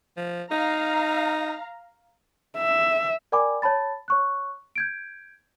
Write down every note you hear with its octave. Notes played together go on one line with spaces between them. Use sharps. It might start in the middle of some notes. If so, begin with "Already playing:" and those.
F3
D#4 F5 A#5
E5
A#4 D5 G5 G#5 B5 D6
C#5 A5 B5 A6
C#5 C#6 F#6
G6 G#6 D7